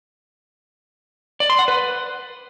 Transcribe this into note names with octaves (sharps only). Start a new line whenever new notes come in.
D5
C6
F#5
B4